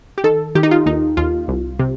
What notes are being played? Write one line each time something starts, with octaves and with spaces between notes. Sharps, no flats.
G4
D#3 A4
D#3 G4
D#4
F4
D#2 D#4
D#2 F4
C2
C3